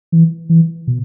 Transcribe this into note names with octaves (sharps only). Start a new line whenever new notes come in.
E3
E3
B2